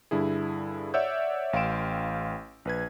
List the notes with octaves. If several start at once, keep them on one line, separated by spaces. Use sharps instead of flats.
G2 D3 E4 G#4
C#5 D5 E5 F#5 E6 G6
A1 F5 G5 C6 D7 E7
A#1 B4 G#6